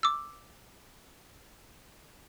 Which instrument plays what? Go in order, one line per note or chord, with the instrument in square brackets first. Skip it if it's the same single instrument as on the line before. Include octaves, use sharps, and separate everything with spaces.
[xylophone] D6 E6